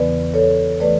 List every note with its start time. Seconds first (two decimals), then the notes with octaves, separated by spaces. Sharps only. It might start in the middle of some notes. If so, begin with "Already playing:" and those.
Already playing: E2 C#3 E3 B3 B4 D5
0.34 A4 C#5
0.80 E3 A3 B4 D5